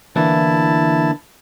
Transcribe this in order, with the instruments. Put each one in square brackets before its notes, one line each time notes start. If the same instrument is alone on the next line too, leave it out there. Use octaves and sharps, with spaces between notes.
[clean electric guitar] D3 A#3 B3 [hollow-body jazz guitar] E3 [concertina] E4 A5